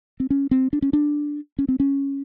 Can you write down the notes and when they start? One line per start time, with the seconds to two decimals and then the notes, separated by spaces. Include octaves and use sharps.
0.20 C4
0.30 C#4
0.51 C4
0.73 D4
0.82 C#4
0.93 D4
1.59 C#4
1.69 C4
1.80 C#4